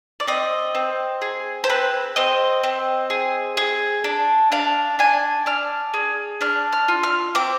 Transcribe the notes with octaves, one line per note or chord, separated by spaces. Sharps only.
D5
C4 D#5
C4
G#4
C5
C4 B4
C4 D#5
C4
G#4
G#4
D4
D4 F5
D4 G#5
D4 F6
G#4
D4 F6
F6
F4
F6
C4 D6